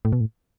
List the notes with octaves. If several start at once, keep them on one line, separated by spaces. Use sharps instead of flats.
A2
B2
A2